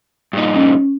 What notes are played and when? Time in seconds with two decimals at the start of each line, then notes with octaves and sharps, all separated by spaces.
0.33 G2 A#2 D#4
0.55 C#4